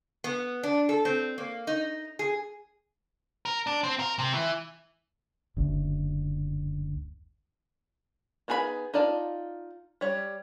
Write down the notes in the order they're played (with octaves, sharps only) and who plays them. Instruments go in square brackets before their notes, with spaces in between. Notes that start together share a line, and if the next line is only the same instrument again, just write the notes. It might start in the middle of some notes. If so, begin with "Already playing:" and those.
[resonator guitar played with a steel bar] B3
D4
A4
C4
A#3
D#4
G#4
[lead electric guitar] A#4
D4
C4
A#4
C3
E3
[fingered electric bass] F#1 D2
[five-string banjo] B3 D#4 G#4 A#4 B5
D#4 F4 D5 A5
G3 C#5